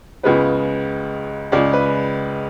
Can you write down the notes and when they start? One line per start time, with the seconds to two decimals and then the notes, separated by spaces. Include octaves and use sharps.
0.23 C#2 C#3 G#3 B3 B4
1.52 C#2 C#3 G#3 D5
1.73 B4